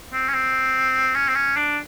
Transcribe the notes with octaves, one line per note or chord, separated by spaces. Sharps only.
C4
C#4
C4
C#4
C4
C#4
D4